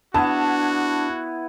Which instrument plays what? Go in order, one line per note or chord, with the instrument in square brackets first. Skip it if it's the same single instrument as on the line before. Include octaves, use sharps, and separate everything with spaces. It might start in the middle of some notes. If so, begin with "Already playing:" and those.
[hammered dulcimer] B3 E4 [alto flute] D4 [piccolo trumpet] F#4 [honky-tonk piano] A5